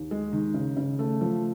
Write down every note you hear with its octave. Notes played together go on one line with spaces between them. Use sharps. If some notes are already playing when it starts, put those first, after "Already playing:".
Already playing: D#2
G#3
D#3
C#3
C#3
A3
F3